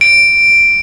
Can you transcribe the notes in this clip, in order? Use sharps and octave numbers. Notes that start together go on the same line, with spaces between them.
D7